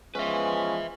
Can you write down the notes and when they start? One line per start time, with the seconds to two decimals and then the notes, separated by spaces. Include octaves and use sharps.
0.15 F3 G#3 B3 C#4 F4 B4 E5